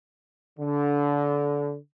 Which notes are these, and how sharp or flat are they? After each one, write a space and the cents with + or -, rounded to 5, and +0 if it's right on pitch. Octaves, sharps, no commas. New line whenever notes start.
D3 -25